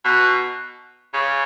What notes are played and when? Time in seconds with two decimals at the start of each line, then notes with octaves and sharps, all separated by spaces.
0.05 B2
1.14 C#3